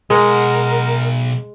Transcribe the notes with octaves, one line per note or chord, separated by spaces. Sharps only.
B1 G#3 A#4 F#5